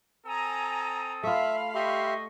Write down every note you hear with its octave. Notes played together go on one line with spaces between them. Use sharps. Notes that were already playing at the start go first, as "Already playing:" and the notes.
C4 A4 G#5 A#5 D#6
A3 F4 E5 F5 B5
G4 D#5 E5 C6 C#6